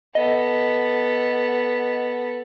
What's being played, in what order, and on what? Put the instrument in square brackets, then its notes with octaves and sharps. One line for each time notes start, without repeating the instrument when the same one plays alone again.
[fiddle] B3 A4 [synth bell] D#5